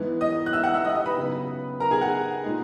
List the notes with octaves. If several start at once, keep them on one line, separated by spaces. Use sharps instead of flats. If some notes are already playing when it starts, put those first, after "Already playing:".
Already playing: G#2 E3 B3
D#5 D#6
F#6
E5 E6
F#5 F#6
E5 E6
D#5 D#6
D#5 D#6
B4 B5
C#3 F#3 B3 D#4
A#4 A#5
G#4 G#5
F#5
A#2 G#3 D#4